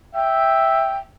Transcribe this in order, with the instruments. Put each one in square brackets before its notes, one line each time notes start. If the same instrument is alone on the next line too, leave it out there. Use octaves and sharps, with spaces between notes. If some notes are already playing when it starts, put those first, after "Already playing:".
[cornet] E5 [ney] G5